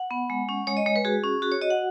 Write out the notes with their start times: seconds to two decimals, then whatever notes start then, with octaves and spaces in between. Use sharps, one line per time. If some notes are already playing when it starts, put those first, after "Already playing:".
Already playing: F#5
0.11 B3
0.30 G#3
0.49 C#4
0.67 G#3 C#5
0.77 D#5
0.86 G#3 C#5
0.96 B4
1.05 F#4 G#4
1.24 C#4
1.42 F#4 G#4
1.52 C#5
1.61 F#4 D#5
1.71 F#5